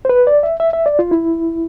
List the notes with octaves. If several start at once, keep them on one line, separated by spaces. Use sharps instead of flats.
C5
B4
D5
E5
E5
E5
D5
F4
E4